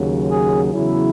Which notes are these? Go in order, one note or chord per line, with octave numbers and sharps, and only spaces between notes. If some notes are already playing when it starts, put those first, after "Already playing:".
Already playing: D#2 C#3 F#3
G#4
E2 C#3 F#3 E4